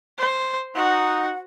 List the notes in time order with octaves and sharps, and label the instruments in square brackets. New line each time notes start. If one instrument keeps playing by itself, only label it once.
[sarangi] C5
[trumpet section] D#4 [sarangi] F#4 [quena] F#5